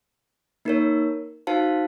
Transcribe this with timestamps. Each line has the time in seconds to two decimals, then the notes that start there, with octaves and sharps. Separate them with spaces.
0.65 A#3 D#4 A#4 C#5
1.47 D#4 F#4 C5 F5 A5